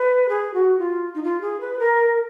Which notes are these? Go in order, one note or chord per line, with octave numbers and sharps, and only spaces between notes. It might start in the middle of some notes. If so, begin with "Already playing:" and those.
Already playing: B4
G#4
F#4
F4
D#4
F4
G#4
B4
A#4